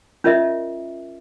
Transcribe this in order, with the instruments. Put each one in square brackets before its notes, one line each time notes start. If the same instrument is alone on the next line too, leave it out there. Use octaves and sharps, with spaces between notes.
[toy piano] C#4 F4 A#4 D#5 E5